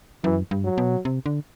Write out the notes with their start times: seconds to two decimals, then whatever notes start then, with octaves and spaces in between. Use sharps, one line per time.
0.24 F#2 E3
0.51 G2
0.64 F#3
0.78 B2
1.05 C3
1.26 D3